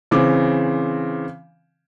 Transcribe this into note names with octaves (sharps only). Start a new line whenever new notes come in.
C#3 E3 C4 D6